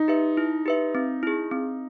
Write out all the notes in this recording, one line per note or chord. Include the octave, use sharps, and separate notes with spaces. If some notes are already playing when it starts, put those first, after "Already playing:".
Already playing: D#4
G4 B4 E5
E4
G4 B4 E5
C4
E4 G#4
C4